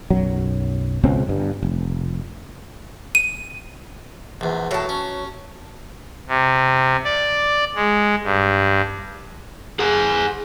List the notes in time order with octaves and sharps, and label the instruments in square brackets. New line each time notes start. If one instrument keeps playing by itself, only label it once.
[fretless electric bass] B1 F#2 F#3
C#2 B2 C4 C#4
G1 G2
F1
[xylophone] D#7
[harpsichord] A#1 E2
[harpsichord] A2 [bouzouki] F#3 A5
[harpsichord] C#4
[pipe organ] C3
D5
G#3
G2
[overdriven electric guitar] G#4 F#5